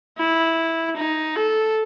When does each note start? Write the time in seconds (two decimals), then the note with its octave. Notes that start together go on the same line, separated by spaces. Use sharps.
0.18 E4
0.97 D#4
1.35 A4